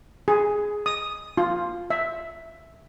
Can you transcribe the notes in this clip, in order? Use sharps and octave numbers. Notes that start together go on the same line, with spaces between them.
G#4
D#6
F4
E5